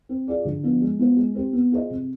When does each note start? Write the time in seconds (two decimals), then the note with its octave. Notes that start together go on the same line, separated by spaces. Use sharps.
0.09 C4
0.28 F4 G#4 D5
0.45 D3
0.63 F3 B3 D4
0.81 G#3
0.99 B3 F4 C5
1.17 G#3
1.35 C4 G4 C5
1.53 B3
1.71 F4 G#4 C5 D#5
1.90 C3